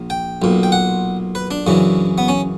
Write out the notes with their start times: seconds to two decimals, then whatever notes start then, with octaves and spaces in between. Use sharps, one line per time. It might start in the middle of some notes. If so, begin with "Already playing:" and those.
Already playing: A#1
0.10 G5
0.42 B1 A#2
0.63 G5
0.72 F#5
1.35 B4
1.51 D4
1.67 F#2 C#3 E3
2.18 B3
2.28 C#4